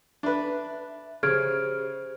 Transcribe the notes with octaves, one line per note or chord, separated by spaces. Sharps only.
D4 B4 E5
C#3 G4 G#4 C5 F6 G#6 D7